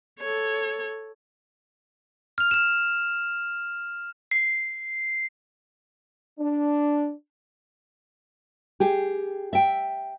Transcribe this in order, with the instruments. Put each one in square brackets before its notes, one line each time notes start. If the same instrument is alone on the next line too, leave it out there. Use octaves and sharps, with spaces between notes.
[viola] A4 C#5
[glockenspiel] F6 F7
F6 E7
[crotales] C7
[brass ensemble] D4
[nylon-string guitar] G4 G#4
E5 G5